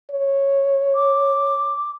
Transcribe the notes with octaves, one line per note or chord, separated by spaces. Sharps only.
C#5
D6